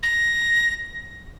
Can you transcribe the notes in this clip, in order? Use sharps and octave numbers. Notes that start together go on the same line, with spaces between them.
A#6